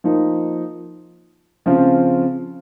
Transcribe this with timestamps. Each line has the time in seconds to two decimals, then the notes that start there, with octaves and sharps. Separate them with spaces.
0.04 F3 A#3 D#4
1.66 C#3 F3 C4 F4